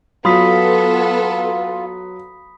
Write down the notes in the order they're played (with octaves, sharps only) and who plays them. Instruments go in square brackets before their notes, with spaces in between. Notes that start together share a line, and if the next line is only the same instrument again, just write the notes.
[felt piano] F#3 [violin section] B3 A4 [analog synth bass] F4 [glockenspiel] B5 D#6 B6